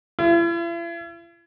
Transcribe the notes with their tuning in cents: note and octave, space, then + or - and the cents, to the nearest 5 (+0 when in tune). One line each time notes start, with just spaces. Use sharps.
E4 +45